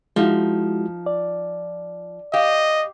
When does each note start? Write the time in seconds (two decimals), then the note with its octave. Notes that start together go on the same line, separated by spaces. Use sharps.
0.16 F3 G#3 D#4 E4 F#4
1.06 D5
2.33 G4 D#5 F5